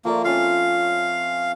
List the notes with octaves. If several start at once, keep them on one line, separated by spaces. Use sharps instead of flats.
F3 A3 A#3 D5
C4 C#4 F4 F5